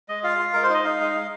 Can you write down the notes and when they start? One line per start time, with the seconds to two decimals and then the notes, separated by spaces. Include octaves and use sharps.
0.09 G#3 D#5
0.23 F4 F5
0.39 F4
0.53 G#3 A#4
0.63 C5
0.70 D#4 D#5
0.85 D#4 F5
1.00 G#3
1.15 G#3